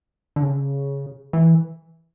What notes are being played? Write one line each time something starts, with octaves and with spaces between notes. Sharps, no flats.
D3
C#3
E3